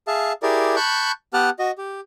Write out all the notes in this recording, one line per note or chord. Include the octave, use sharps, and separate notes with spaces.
G#4 E5 F5 A5
E4 G4 G#4 A#4 D5
A5 B5 C#6 F#6 G6
B3 G4 B4 F#5 A5 F6
F#4 D#5
G4